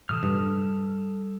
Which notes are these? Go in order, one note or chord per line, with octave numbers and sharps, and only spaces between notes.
A2 C3 E3 A4 D#6 F6
G2 G3